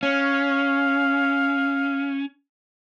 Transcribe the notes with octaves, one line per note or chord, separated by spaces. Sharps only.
C#4 F5